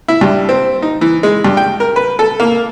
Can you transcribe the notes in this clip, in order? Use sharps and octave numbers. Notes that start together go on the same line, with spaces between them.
E4
G2
C4
D#4
E3
G#3
G2
G5
A#4
B4
A4
A#3